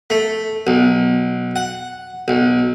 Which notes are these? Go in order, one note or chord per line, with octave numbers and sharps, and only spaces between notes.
A3
B1
F#5
B1